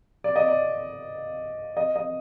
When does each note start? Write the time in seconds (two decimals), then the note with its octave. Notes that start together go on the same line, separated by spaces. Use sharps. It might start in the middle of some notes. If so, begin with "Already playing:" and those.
0.24 D5
0.36 D#5
0.48 D5
1.77 D#5
1.96 D#5